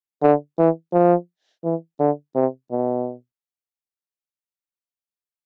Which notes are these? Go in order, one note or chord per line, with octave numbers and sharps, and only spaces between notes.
D3
E3
F3
E3
D3
C3
B2